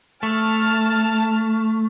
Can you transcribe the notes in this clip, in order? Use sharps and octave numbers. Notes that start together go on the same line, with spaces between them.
A3 A5 F6